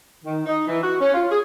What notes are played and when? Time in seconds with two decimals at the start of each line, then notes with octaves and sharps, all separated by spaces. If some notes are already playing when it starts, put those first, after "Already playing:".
0.25 D#3
0.46 D#4
0.67 E3
0.82 F#4
1.00 C#4
1.14 F4
1.30 G#4